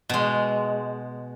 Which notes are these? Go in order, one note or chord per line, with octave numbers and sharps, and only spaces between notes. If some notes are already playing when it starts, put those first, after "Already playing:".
B2 G#3